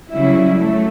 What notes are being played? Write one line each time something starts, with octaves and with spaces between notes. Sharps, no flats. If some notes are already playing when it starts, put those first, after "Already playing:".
C#3 F#3 G3 E4
F#3 A3